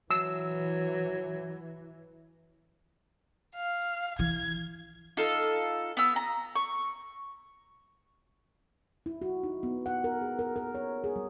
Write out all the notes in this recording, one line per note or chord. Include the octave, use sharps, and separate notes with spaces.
E3 F#3 E6
F5
E3 G#6
D#4 F4 A4
B3 E6
A#5
C#6
E4
F#4
D#4
B3
F#5
A#4
G#4
A#4
A#4
C#5
G#4
G3